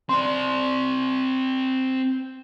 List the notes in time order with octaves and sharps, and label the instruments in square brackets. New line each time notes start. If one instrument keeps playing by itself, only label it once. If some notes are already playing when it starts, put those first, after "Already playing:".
[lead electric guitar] C4 D5 [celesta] C6